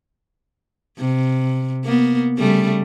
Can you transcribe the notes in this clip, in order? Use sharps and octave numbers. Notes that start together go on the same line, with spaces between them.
C3
A#3 B3
C#3 G3 A3